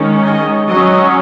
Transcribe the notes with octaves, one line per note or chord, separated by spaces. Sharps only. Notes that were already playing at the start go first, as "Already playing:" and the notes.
Already playing: D#3 G#3 C#4
D#5
F#3 C#4 D#5